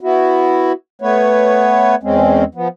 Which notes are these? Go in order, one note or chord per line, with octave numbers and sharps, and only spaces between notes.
B3 E4 F#4
A3 B3 B4 C#5
E2 G#3 C4 C#4
F3 B3